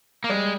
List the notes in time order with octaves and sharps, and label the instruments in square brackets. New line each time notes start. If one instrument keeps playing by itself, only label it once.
[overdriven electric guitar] A#3
[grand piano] G3 [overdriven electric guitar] G#3